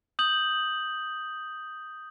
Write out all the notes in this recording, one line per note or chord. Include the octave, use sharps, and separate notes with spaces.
D#6 G6 F#7